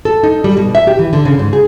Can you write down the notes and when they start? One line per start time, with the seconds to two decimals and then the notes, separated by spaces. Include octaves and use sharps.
0.05 A4
0.23 D#4
0.44 G3
0.57 B2
0.75 E5
0.87 G4
0.99 E3
1.13 D3
1.25 C#3
1.39 G#2
1.53 G#4